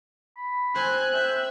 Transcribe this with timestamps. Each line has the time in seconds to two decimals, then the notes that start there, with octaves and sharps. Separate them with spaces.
0.36 B5
0.76 C4 C5 G#5 F#6
1.14 E5 G5